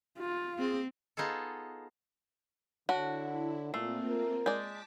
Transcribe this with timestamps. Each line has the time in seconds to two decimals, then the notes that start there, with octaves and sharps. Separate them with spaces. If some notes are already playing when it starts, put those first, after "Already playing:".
0.19 F4
0.59 C4 G#4
1.17 B3 D#4 F4 G#4 A4
2.89 D3 E4 F#4 C#5 F#5 A5
3.74 A#2 A3 A#3 C4 F4 C7
4.09 A#4
4.46 G#3 D5 A5 D6 G6 B6